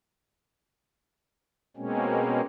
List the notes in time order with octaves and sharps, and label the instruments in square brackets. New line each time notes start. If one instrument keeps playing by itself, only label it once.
[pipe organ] B2 G#3 A#3 C4 C#4